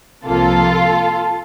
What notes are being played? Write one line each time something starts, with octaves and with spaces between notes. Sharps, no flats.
C2 C3 F3 A#3 F4 A4